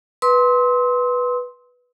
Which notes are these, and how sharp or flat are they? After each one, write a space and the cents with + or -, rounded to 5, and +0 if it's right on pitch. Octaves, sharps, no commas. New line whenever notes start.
B4 -5 C6 +0 E6 -45